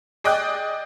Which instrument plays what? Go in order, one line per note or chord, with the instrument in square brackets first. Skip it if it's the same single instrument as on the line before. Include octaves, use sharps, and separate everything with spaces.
[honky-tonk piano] G#4 D5 D#5 G5 D6 F#6